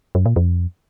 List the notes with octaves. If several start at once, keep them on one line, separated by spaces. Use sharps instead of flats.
F#2
A#2
F2